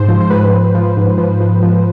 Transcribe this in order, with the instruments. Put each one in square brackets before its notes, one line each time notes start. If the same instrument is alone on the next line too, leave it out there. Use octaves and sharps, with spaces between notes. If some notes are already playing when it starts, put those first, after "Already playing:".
Already playing: [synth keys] G#2 C5
F3
C5
G#2 B4
G#2
F3
G#2
F3
F3
F3